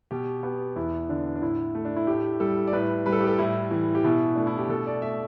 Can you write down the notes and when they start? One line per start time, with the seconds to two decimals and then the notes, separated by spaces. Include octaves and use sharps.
0.11 B2 G4
0.43 B3 G4
0.76 E2 E4
1.09 D3 D4
1.35 D4
1.41 A2 E4
1.75 A3
1.85 D4
1.96 E4
2.07 A2 G4
2.40 G3 A4
2.67 D5
2.73 A2 B4
3.06 G3 B4
3.12 A4
3.21 G4
3.27 A4
3.39 A2 E4
3.71 E3
3.95 G4
4.04 B2 E4
4.35 A3 D4
4.47 E4
4.58 G4
4.69 B2 A4
4.87 D5
5.02 A3 E5